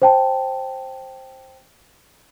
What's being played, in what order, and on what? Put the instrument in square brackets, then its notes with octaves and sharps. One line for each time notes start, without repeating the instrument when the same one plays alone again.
[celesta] C5 G5 A5